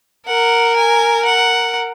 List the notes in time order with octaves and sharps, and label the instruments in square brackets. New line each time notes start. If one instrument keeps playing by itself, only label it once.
[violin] A#4 [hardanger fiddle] F#5
[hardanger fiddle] G#5
F#5